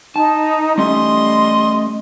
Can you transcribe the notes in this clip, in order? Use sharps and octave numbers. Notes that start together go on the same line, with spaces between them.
D#4 A5
G3 A3 C#4 D#5 C6